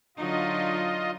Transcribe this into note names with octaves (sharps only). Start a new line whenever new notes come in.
D3 F#3 D#4 F4 D#5